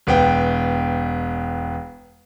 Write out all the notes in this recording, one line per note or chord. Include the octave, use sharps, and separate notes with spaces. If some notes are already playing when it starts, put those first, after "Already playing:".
E1 B3 G5